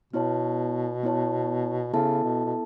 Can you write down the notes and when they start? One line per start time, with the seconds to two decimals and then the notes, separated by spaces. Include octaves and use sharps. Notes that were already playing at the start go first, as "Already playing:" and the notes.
0.13 B2 B3 E4 C#5 A5
1.03 B3 E4 C#5 A5
1.93 C#3 B3 E4 A4 E5 A5
2.24 B2
2.45 B2